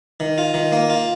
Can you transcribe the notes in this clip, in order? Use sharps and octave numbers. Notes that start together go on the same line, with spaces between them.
D#3
F4
D#3
A#3
F4